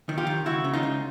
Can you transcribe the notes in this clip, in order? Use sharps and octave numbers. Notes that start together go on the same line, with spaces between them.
D#3
F4 G4
D#3
C#2 E4 F#4
C#3
D#4 F4
C#2